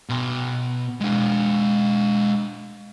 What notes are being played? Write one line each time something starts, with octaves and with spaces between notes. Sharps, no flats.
B2 C6
G#3 D4